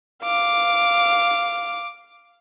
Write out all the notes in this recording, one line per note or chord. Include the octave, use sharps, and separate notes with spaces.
F5 D6